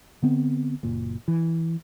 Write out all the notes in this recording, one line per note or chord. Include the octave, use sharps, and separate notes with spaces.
D3 B3 C4
F#1 A#2
E3